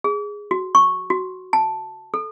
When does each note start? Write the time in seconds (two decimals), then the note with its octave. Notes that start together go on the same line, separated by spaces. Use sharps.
0.04 G#4
0.51 F#4
0.75 C#6
1.10 F#4
1.53 A5
2.14 A4